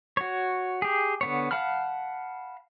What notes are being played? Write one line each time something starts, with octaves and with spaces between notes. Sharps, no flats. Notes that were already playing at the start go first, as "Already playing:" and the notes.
F#4 C#5
G4 G#4
D3 B3 C#5
F5 F#5 A5 B5 F6